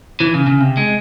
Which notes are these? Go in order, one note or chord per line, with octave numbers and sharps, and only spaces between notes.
E3
C#3
C#3
C3
G#3